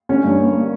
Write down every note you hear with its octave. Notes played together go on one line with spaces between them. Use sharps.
D3 C#4 C#5
G2
A#3
A#3